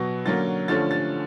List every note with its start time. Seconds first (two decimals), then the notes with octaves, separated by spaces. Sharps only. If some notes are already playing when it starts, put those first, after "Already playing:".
Already playing: B2 F#3 B3 A#6
0.25 D3 F#3 A#3 C#4 A6
0.68 D3 F3 A3 C#4 A6
0.91 A6